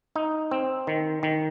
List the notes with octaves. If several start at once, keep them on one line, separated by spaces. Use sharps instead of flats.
D#4
C4
D#3
D#3